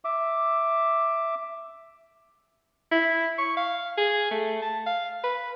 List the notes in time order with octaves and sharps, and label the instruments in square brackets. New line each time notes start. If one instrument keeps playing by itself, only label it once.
[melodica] E5 D6
[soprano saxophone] E4
C#6
F5
G#4
A3
A5
F5
B4